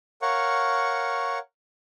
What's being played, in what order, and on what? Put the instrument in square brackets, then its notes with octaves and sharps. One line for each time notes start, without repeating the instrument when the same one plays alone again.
[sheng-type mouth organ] A#4 C#5 F5 F#5 C#6